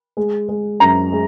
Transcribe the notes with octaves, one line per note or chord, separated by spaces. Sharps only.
G#3
G#3
F#2 A#5
G#3